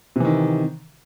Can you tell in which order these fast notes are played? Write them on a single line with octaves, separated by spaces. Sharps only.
C3 E3 D#3